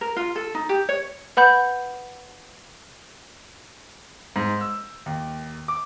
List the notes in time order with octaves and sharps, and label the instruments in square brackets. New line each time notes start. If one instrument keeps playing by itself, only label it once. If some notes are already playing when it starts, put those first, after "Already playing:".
[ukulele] A#4
F4
A4
D#4
G4
C#5
[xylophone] B4 F#5 B5 G6
[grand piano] G#2
E6
D#2
D6